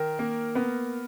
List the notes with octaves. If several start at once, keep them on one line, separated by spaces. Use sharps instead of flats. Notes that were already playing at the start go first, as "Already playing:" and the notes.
Already playing: D#3 A#4
A#3
B3